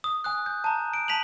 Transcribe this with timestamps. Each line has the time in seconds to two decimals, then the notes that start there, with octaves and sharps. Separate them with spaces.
0.04 D#6
0.24 G#5 D#6 F#6
0.46 G6
0.64 A5 A#5
0.94 D7
1.08 A5 B6 D#7 F7 F#7